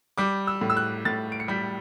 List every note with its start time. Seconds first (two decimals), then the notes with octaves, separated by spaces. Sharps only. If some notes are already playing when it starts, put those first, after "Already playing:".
0.18 G3 D6
0.47 E6
0.61 A2
0.70 E6
0.77 F#6
1.05 A2 A6
1.32 D7
1.40 C#7
1.48 G3 B6